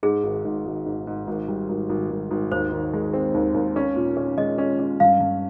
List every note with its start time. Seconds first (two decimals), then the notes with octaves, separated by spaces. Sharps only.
0.03 G#2 G#4
0.23 G#1
0.45 G#2
0.66 G#1
0.86 G#2
1.07 G#2
1.27 G#1
1.48 G3
1.69 G#1
1.89 G#1
2.10 G#1
2.31 G#1
2.51 D#2 C5
2.72 D#3
2.93 G#3
3.14 C4
3.34 D#2
3.54 D#2
3.76 C#4
3.96 A#2
4.17 C#4
4.37 G#3 D#5
4.58 C#4
4.79 C#4
5.00 G2 F5
5.20 G2